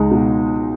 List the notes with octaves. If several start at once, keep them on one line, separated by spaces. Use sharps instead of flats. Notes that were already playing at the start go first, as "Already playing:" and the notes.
Already playing: C#2 G#3 D#4
B2